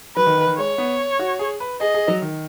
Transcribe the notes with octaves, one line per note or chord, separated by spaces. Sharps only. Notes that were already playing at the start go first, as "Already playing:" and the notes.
F#3 B4
D#3
D#3
D#3
G#3 C#5
B3
F#4
G#4
B4
G#4 D#5
G#4
F#3
D#3